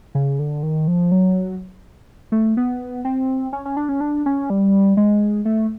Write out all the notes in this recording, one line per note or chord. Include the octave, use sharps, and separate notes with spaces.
C#3
D3
D#3
F3
F#3
A3
B3
C4
C#4
C#4
D4
C#4
D4
C#4
G3
G#3
A3